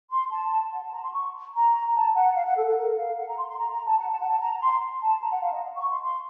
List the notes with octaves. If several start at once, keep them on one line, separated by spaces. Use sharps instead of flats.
C6
A5
F#5
A5
A#5
C6
C#6
A#5
A#5
A5
F#5
F5
F#5
A4
A4
A#4
F5
F#5
A#5
C6
C6
A#5
A#5
A5
F#5
A5
F#5
A5
A#5
C6
A5
A#5
F#5
F5
D#5
C#6
C6
C6